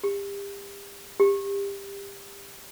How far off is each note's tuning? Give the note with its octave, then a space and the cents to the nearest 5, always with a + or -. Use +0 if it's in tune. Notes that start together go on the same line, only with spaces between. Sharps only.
G4 +35
G4 +25